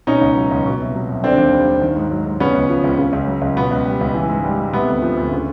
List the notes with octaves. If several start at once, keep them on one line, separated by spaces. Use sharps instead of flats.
B2 C#4 D#4
C#2
F#3
C#2
B2
C2
F#3
C2
D3 C4 D4
D#2
G3
D#2
D#3
G#2
F#3
G#2
C#3 B3 C#4
C#2
F3
C#2
C#3
C#2
F#3
C#2
B2 B3
C#2
G3
C#2
E3
G#2
G3
G#2
C3 B3
D2
F3
D2
C#3